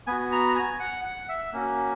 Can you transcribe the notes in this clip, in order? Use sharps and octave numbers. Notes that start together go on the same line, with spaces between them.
B3 F#4 G#5
A#5
G#5
F#5
F#5
E5
A#3 C#4 F#4